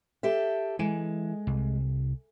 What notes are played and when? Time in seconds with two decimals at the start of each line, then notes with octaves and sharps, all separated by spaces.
0.23 G4 A4 E5
0.79 E3 G#3
1.47 C2